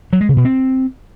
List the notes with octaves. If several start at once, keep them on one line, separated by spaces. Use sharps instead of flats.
F#3
G#3
C#3
B2
C4